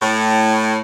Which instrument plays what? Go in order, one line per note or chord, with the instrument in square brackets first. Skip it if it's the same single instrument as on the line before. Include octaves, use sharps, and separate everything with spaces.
[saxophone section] A2